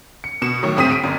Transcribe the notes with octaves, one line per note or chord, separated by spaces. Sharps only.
C#7
B2 C#7 E7
A2 D#3 F#3
D2 G#2 C4 D#6 B6 D#7
D7
G1 F#2